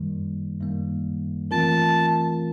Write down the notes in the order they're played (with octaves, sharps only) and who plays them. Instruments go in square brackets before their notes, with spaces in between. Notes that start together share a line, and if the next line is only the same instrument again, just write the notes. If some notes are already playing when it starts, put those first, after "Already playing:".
Already playing: [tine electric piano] F#2 D#3 G3 A#3
F#2 D#3 G3 A#3
[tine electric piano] E3 A3 C4 F4 A#4 [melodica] A5